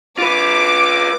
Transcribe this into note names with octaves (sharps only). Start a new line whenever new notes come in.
F4 B4 D6